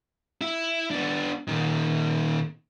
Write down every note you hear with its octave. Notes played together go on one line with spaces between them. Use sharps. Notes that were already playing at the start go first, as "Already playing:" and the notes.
E4
B3 D4
A#2 D#3